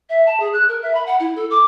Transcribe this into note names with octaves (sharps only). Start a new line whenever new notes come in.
E5
A5
G#4
F#6
A#4
E5
B5
F#5
E4
A4
D6